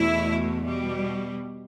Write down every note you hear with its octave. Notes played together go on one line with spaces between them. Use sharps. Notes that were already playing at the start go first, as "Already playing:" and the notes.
Already playing: E2 B2 A3 E4
B2 G3